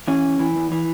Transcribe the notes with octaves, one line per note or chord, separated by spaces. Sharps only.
E3 C#4
E2
E3
E2
E3